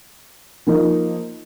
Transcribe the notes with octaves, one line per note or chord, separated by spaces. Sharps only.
F3 A#3 D#4